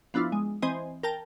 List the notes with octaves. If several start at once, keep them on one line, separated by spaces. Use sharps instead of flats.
F3 B3 D4 E4 F4
G#3
E3 C4 C5 D#5 G#5
A#4 G5 A5 A#6